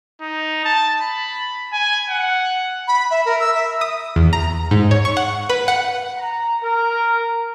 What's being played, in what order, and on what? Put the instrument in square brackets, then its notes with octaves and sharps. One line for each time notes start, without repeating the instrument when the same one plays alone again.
[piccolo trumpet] D#4
A5
B5
G#5
F#5
[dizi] B5
E5
A#4
E6
E5
[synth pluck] D#6
E2
A#5
G#2
C#5
C#6
F#5
B4
F#5
[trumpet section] A#5
A#4